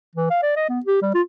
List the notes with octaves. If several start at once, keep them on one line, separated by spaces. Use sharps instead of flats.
E3
F5
D5
D#5
B3
G4
G3
F4